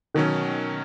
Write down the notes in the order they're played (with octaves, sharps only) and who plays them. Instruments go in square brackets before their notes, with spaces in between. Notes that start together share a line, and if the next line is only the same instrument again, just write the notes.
[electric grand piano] B2 F#3 C#4 [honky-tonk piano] D#3